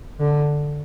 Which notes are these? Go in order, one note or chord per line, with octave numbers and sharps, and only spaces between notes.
D3